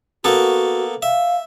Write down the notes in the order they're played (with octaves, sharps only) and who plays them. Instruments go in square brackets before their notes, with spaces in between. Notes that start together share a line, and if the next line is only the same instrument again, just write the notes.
[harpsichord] A#3 B3 A4 [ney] F#4
[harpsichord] E5 [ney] F5